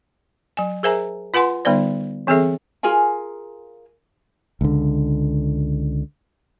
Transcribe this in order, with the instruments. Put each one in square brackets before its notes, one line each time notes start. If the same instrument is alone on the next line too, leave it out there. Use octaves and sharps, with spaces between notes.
[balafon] F#3 G#5
G#4 A#4 C5 E5 G#5 A#5
F4 B4 F#5 G#5 C6
D3 G3 B3 D#4 C5 D5
E3 C4 G#4 A4 E5
[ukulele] F4 G#4 A#4 G#5
[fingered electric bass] C#2 D3